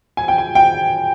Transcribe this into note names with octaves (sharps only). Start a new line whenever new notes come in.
G#5
G5
G#5
G5